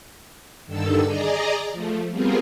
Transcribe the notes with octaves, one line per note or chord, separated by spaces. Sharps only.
G2 D3 D#3 A4 E6
G#4 D5 D#5 A#5
F3 A3
G3 B3 C4 F4 G#4 A#4